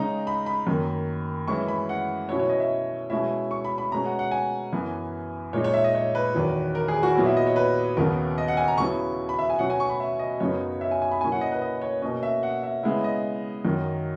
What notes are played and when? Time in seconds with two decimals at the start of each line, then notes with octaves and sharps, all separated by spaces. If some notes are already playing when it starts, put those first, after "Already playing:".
Already playing: C#3 G#3 D#4 A#5
0.27 B5
0.46 B5
0.67 F#2 D#3 A#3
1.48 F#2 E3 G#3 C#4 E4 C#6
1.68 B5
1.89 F#5
2.29 B2 F#3 C#4 E4 C#5
2.40 C#5
2.49 D#5
2.60 E5
3.10 B2 G#3 C#4 E4 E5
3.51 C#6
3.65 B5
3.78 B5
3.91 B2 G#3 C#4 A#5
4.06 F#5
4.19 F#5
4.31 G#5
4.73 F#2 E3 B3
5.53 A#2 G#3 D#4 C#5
5.64 C#5
5.74 E5
5.84 D#5
5.95 C#5
6.15 B4
6.35 E2 D#3 F#3
6.75 A#4
6.88 G#4
7.03 F#4
7.15 A#2 F#3 B3 E4
7.26 E5
7.37 D#5
7.47 C#5
7.56 B4
7.97 D#2 C#3 F#3 B3 A#4
8.38 D#5
8.48 F#5
8.57 G#5
8.68 A#5
8.78 C#3 F#3 B3 E4 C#6
9.29 B5
9.39 E5
9.50 G#5
9.59 B2 F#3 C#4 F#5
9.70 G#5
9.80 C#6
9.89 B5
10.00 E5
10.19 D#5
10.40 F#2 C#3 F#3 B3 D#4 C#5
10.81 E5
10.91 G#5
11.02 G#5
11.11 B5
11.21 B2 A#3 C#4 E4 G#5
11.32 F#5
11.41 D#5
11.51 B4
11.62 D#5
11.82 C#5
12.02 B2 A#3 C#4 D#5
12.23 E5
12.43 F#5
12.63 E5
12.83 C#3 G#3 B3 E4 E5
13.04 D#5
13.65 F#2 D#3 F#3